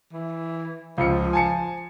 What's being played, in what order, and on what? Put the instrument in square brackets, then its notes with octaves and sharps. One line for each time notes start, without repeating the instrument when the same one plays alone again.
[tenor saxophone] E3
[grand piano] C#2 F4 C#7 [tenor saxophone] F3
[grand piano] G#5 A5 C#7